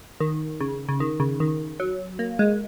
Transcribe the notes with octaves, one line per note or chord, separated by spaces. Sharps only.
D#3
C#3
C#3
D#3
C#3
D#3
F#3
A#3
G#3